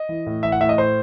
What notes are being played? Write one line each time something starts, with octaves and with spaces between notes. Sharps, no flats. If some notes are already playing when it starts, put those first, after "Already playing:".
Already playing: D#5
E3
A2
E3 E5
F#5
A2 E5
D#5
A2 C5